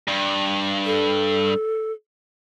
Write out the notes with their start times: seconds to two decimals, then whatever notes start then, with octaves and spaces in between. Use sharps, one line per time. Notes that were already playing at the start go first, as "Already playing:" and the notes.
0.08 G2
0.85 A4